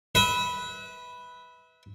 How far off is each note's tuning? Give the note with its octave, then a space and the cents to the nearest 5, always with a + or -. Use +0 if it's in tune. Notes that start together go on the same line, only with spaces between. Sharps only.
B4 +0 E5 -35